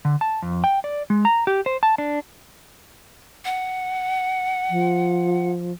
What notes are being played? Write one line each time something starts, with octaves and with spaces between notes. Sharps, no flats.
D3
A5
F2
G5
D5
G#3
A#5
G4
C5
A5
D4
F#5
F3